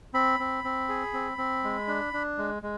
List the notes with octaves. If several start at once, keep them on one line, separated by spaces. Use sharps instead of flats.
C4 B5
C4
C4
G#4
C4
C4
G#3
D4
D4
G#3
G#3